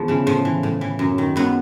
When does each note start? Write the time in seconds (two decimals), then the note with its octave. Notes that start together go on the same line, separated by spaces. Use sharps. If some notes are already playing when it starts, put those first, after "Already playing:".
Already playing: E2 F3
0.08 C#3 E3
0.27 A2 F3
0.45 E3
0.63 A2
0.81 E3
0.99 F#2
1.18 D#3
1.36 F#2 B3